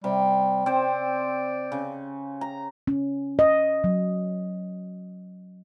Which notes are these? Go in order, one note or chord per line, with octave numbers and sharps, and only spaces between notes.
C3 G3
C4 C5 D5
C#3
A#5
C#4
D#5
F#3